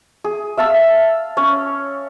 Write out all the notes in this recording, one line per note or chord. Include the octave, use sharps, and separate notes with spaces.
G#4
E5 F5 A5 E6
C#4 C#5